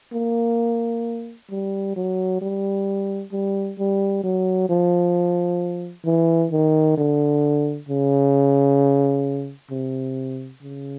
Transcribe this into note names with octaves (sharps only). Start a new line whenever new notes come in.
A#3
G3
F#3
G3
G3
G3
F#3
F3
E3
D#3
D3
C#3
C3
C#3